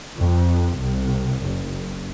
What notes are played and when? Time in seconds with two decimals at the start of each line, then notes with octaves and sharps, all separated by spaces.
0.17 F2
0.78 C2
1.45 F#1